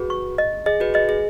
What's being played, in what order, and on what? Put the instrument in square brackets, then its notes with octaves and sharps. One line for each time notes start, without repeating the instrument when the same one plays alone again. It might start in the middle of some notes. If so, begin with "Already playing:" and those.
Already playing: [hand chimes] F#4 B4 [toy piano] G#4
[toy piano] C#6
D#5
[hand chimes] G#4 [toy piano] D#5
[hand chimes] F#4 B4
[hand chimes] G#4 [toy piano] D#5
[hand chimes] G#4